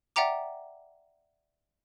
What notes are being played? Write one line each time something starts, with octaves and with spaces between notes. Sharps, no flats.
D5 E5 F#5 G5 A#5 D6